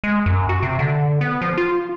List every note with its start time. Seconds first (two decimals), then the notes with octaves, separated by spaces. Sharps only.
0.04 G#3
0.26 F#2
0.49 F#4
0.63 C3
0.79 D3
1.21 B3
1.41 F3
1.57 F4